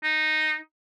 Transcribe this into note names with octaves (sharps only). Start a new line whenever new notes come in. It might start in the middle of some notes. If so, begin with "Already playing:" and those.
D#4